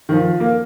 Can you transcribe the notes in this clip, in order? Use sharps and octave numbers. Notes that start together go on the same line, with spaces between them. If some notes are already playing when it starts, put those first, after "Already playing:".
D#3
F3
A#3